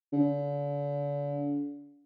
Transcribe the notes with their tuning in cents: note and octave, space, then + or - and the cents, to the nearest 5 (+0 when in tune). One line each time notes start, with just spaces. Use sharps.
D3 -40